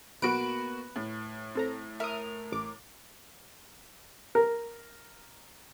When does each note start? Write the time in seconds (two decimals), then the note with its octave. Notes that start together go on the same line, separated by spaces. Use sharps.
0.22 B1 A#3 B3 F#4 B4 D7
0.96 A2
1.55 C4 A4 A#5
2.00 A#4 E5 D#6
2.52 A1 D6
4.35 A#4